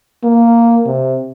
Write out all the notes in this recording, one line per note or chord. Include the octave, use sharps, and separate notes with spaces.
A#3
C3